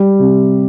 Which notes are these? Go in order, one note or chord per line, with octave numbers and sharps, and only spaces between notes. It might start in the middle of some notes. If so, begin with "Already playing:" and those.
Already playing: G3
C3